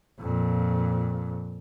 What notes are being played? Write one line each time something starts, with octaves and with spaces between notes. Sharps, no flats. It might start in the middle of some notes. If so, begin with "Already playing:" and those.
F2 A#2